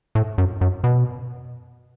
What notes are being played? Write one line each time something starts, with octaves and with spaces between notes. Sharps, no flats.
A2
F#2
F#2
B2